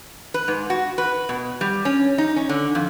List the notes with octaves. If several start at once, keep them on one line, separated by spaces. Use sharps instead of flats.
B4
G#2
F#4
B4
B2
G3
C#4
D#4
C#4
D3
F2